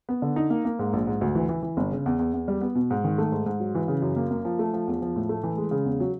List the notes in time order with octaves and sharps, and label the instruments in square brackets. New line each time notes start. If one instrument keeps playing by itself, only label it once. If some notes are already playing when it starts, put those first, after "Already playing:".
[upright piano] B3
D3
D#4
A#3
A#3
G#2
A#1
G#2
D2
E3
E3
E3
G1
C#3
E2
E2
E2
G3
B3
B2
G#2
D#3
A3
G#2
G#2
F#3
E3
C#3
F#2
A#3
A#3
F3
A3
F3
E2
F3
A2
A3
E3
G#3
C#3
E2
F#3